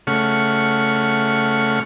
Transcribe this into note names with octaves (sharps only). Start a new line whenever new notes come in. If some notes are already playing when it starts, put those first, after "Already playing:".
C#3 A3 F#5 C#6 F6